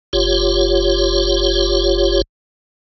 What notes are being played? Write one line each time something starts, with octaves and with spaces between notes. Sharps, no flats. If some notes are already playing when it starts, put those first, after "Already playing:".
F#1 F4 G4 C#5